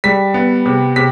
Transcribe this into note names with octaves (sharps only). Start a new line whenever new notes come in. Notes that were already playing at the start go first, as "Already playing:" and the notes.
G3 B6
B3
C3
C3 B6